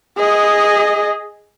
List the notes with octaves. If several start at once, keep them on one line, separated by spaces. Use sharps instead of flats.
G#4 D#5